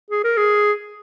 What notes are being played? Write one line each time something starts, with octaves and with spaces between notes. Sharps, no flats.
G#4
A#4
G#4